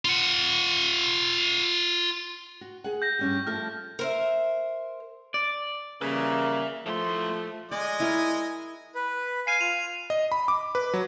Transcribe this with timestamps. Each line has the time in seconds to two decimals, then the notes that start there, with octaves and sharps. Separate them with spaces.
0.05 F4 F#5
2.61 F#4
2.84 G#4 F#5
3.02 G6 A#6
3.19 G2 C#4 G4
3.47 F3 A3 A4 F6 A#6
3.99 A#4 C5 E5
5.34 D5
6.02 C#3 G3 A#3 B4 E5
6.86 A2 F3 A3 C6
7.72 G#3 D5 D#5 G#5
8.00 E4 A#4
8.95 B4
9.47 F5 G#5 C7 D#7
9.61 F4 F7
10.10 D#5
10.32 B5
10.48 D6
10.75 B4
10.94 F#3